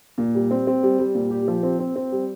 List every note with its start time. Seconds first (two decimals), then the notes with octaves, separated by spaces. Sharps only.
0.18 A#2
0.35 G3
0.51 C4
0.67 C4
0.83 G3
0.99 G3
1.15 A#2
1.31 G4
1.48 F3
1.63 C4
1.79 C4
1.96 C4
2.12 G3